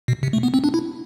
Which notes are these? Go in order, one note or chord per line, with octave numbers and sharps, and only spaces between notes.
B2
C3
A3
B3
C4
D4
E4